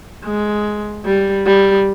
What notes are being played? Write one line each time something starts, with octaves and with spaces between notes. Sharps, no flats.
G#3
G3
G3